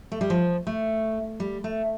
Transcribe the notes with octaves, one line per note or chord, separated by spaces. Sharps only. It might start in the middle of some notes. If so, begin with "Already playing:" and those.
A3
G3
F3
A3
G3
A3